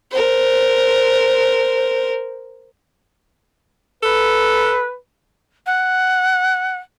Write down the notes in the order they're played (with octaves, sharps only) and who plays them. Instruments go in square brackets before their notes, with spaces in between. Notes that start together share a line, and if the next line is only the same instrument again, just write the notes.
[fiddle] A#4 C5
[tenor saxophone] A4 [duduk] B4
[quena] F#5